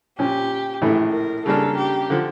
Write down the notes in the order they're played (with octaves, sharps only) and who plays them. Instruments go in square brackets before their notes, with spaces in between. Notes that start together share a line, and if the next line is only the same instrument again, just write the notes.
[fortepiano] A#2 F3 C#4 [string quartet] G4
[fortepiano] A#1 A2 E3 A3
[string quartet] A#4
[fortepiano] C#3 G3 A#3 D4 [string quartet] A4
[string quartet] G4
[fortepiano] D3 F3